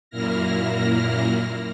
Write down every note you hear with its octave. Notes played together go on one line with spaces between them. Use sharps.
F#2 A#2 A#3 E4 F6 A#6